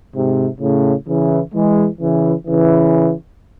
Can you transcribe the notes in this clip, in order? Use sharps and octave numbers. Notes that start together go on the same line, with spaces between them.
G#2 C3
A2 C#3
C#3 E3
E3 G#3
C#3 E3
C#3 E3